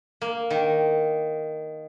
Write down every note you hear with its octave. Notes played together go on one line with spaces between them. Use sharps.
A#3
D#3